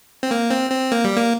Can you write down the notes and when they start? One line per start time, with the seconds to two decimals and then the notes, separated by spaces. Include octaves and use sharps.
0.23 C4
0.31 A#3
0.50 C4
0.71 C4
0.92 A#3
1.04 G3
1.17 A#3